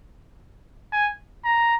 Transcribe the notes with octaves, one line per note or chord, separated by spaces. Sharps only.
G#5
A#5